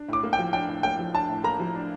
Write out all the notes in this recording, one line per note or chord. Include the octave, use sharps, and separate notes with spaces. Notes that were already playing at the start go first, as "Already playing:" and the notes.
Already playing: D4
A2 D6
A#3
G5
F3
D4 G5
A2
A#3 G5
F3
D4 A5
A2
A#3 A#5
F3
D4